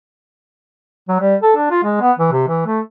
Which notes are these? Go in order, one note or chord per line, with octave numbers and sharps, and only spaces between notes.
F#3
G3
A4
D4
F4
G#3
B3
E3
C3
E3
A3